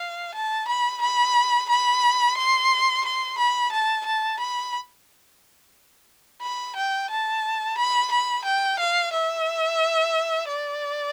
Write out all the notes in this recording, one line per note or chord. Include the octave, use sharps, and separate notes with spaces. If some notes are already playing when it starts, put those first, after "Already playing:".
Already playing: F5
A5
B5
B5
B5
C6
C6
B5
A5
A5
B5
B5
G5
A5
B5
B5
G5
F5
E5
D5